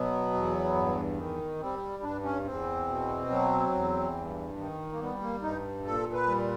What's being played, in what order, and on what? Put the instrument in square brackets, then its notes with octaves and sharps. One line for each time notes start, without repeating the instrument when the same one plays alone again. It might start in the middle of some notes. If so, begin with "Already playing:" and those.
Already playing: [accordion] B2 F#3 B3
E2
G2
D#3
G3 C4
G2 D4
C#4
E2 C4
B2
F#3
E2
G2
D#3
A#3
G3 B3
A#3
G2 D#4
A#2 A4
B4
G3